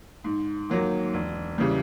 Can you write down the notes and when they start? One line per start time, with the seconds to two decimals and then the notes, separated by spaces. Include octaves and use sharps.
0.24 G#2
0.70 D#3 F#3 A#3
1.14 E1
1.58 C#3 E3 G3